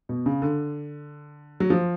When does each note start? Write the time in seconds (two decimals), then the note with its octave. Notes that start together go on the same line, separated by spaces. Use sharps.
0.09 B2
0.26 C#3
0.42 D3
1.60 F#3
1.70 F3